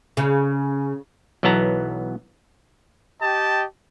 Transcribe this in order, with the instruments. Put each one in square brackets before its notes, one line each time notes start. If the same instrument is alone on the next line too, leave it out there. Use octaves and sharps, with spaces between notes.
[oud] C#3
[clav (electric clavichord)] B1 E3 F#3 B3 A5 A#5
[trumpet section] G4 D#5 G5 A5